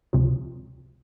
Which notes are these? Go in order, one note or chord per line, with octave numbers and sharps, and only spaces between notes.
C#2 C3 F3